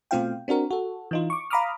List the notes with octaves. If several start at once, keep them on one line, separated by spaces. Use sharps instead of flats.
B2 A3 C4 F4 F5 G5
C4 D4 F#4 A#4
F#4 A4
E3 D#4 F4
C#6 D6
F5 A#5 B5 D6 D#6 F6